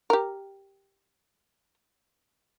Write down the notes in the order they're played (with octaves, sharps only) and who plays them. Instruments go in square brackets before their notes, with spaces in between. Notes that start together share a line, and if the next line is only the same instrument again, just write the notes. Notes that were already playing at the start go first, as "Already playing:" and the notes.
[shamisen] G4 A#4